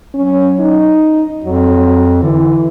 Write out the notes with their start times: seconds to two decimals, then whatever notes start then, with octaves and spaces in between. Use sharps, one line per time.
0.14 F#3 C#4
0.59 D#4
1.44 F2 F#3
2.22 D3 E3